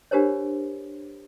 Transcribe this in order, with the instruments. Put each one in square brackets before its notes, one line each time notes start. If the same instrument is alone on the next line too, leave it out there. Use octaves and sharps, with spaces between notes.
[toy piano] D4 F#4 G4 A#4 C5 C#5